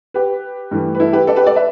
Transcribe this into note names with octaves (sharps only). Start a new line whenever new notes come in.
G4 B4
G2 E3 A3
B4
E4 A4
G4 B4
A4 D5
G4 B4
A4 D5
B4 E5